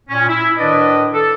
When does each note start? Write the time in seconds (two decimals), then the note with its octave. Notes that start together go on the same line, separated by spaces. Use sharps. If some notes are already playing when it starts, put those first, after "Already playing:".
0.09 A#2 C#4
0.28 E4
0.58 A2 D#3 D4 B4 D5 D#5
1.14 A4